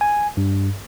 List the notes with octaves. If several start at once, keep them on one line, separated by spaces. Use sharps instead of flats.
G#5
G2